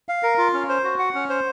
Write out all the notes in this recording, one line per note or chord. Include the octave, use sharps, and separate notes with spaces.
F5
A#4
F4
C#4
C5
F#4
F#5
C#4
C5